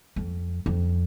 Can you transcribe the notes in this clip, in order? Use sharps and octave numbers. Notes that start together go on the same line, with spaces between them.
F2
F2